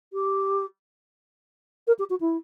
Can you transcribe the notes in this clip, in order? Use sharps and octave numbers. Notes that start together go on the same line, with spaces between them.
G4
A#4
G4
F#4
E4